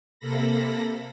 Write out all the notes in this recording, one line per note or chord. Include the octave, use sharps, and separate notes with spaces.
C3 A#3 A4 B5 A#6